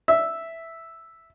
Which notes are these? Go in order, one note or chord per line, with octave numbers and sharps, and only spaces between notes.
E5